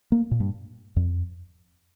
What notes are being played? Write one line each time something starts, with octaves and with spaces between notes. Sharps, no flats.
A#3
A#2
G2
F2